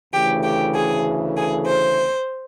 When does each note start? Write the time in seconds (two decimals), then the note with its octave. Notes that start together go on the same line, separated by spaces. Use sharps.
0.13 D2 C#3 E3 A3 G4
0.43 G4
0.75 G#4
1.37 G#4
1.67 C5